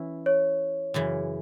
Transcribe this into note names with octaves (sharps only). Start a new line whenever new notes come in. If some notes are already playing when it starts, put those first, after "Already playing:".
Already playing: E3 C#4 E4
C#5
F#2 C#3 E3